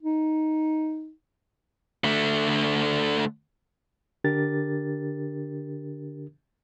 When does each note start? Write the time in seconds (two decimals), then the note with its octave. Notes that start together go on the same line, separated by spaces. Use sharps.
0.03 D#4
2.04 D3 A3
4.24 D3 D4 G4 A#4 A6